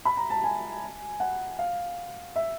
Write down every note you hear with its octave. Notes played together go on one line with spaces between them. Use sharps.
B5
A#5
A5
G#5
F#5
F5
E5